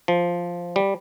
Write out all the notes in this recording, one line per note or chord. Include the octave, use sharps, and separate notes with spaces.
F3
G3